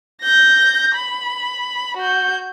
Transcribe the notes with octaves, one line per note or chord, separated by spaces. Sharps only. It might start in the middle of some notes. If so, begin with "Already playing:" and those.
G6 A#6
B5
F#4 G6